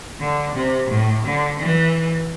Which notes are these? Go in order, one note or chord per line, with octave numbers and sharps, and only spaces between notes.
D3
C3
A2
D3
E3